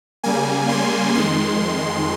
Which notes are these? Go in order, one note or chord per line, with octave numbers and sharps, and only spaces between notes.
C#3 G3 A#3 G#5
C6
F2 D#3 G#3 C6